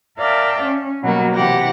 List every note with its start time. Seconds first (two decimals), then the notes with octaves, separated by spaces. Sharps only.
0.17 A#4 D5 E5 F5 G5 A5
0.62 C#4
1.02 B2 F#3 G3 A#3 F#4
1.34 C3 E3 G4 F#5 A#6